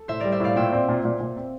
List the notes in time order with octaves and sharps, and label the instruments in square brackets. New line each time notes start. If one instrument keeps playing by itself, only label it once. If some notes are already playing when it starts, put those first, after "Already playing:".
Already playing: [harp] A4
[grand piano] A2 [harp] C5 E5
[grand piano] G3 [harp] A#4 D5
[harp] C5 E5
[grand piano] A2 [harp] D5 F5
[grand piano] A#2 [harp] E5 G5
[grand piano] C4
A#2
A#2
A#2
C4